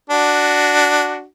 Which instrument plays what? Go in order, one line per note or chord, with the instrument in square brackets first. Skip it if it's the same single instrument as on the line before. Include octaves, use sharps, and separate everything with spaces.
[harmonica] D4 F#4